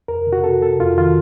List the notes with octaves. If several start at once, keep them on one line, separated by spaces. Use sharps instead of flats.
F2 A#4
C3
F#4
C3 A4
C3 A4
F2 F4
D#3 F4